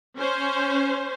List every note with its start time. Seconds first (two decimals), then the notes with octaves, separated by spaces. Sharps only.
0.18 C#4 C5